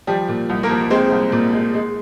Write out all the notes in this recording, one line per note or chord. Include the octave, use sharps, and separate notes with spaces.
F3 G3 G4
A#2
C2
A#3 A#4
F3
G#3 C4 C5
C2
A#2
G#3
G#3